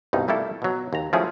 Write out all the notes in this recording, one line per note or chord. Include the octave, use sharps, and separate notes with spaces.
C2 G2 B2 D#4
G3 A3 A#3 E4 A4
B2 F#3
D#2 A#5
F3 F#3 A3 C#4 E4 G#4